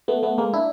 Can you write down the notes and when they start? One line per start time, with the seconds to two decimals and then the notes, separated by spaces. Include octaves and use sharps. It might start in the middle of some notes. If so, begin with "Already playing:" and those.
0.08 A3 B3
0.23 A3 B3
0.38 G#3 A#3
0.53 D4 E4